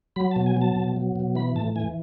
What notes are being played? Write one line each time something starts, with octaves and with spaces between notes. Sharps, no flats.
F#3 B5
A5
B2
G#5
F#3 A5
B2
F#3
B2
E3 B5
A2 A5
E3 G#5